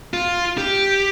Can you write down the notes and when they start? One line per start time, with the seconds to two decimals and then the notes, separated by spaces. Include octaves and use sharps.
0.14 F4
0.58 G4